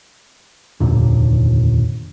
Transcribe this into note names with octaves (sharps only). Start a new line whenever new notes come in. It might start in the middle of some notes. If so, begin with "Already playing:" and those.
F1 D#2 A#2 D3